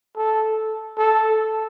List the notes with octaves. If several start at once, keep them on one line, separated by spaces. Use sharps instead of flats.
A4
A4